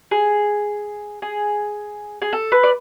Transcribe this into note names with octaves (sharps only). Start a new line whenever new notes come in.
G#4
G#4
G#4
A4
B4
D5